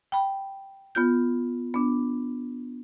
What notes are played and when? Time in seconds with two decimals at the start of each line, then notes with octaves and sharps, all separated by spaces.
0.12 G5 B5
0.95 B3 F4 G6
1.74 B3 D4